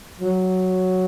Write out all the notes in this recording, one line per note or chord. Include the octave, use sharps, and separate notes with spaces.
F#3